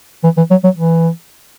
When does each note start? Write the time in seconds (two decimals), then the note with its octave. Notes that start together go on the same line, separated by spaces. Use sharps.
0.24 E3
0.37 E3
0.50 F#3
0.64 F#3
0.77 E3